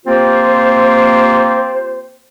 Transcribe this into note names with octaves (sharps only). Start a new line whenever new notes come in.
A#3 C4 F4 G4 C5